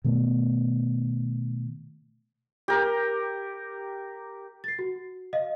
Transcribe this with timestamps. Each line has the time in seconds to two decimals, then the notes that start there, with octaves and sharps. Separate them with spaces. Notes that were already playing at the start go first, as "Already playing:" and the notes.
0.04 B2 D#3 A3 B3
2.68 G4 A#4
4.64 A6 C7
4.79 F#4
5.33 D#5 F5